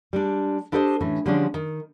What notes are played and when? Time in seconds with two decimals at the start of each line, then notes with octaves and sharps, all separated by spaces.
0.13 G3 G#3 D4
0.72 D4 E4 G4 A4 C5 D#5
1.01 A2 E3 C#4
1.26 D3 F3 G3 G#3 C#4 D4
1.54 D#3